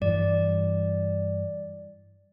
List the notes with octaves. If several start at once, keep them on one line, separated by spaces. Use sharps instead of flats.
G2 E3 D5